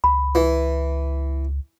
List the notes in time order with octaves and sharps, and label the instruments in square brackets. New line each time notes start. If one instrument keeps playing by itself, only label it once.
[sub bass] C#2 [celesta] B5
[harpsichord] E3